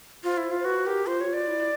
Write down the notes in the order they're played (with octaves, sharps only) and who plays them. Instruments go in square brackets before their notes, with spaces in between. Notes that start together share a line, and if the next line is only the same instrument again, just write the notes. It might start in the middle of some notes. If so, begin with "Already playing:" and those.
[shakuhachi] F4 [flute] C5
[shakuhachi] E4
F4
[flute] C5
[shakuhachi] F#4 [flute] B4
[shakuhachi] G4 [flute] A#4
[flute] F4 [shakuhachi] C5
[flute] F#4 [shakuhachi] C#5
[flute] F4
[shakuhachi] D5
[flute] E4